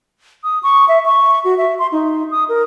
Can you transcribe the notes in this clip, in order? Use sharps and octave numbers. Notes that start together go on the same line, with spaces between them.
D#6
C#6
E5
C#6
F#4
E5
C6
D#4
D#6
A#4